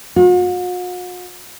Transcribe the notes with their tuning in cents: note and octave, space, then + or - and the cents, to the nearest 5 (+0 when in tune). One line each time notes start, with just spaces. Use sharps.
F#4 -45